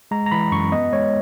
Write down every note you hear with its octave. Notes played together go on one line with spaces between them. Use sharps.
G#3 A#5
A#5
E3 B5
F#2 C#6
B3 D#5
G#3 C#5